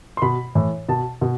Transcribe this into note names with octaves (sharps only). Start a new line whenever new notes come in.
C6
B2 B5
A2 E3
B2 A5
B2